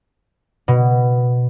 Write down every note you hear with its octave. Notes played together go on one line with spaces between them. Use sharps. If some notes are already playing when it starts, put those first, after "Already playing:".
B2